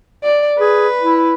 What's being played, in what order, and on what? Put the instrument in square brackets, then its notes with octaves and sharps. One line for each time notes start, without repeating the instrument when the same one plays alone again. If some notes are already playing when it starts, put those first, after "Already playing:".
[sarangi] D5
[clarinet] G#4 [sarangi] B4
[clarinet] E4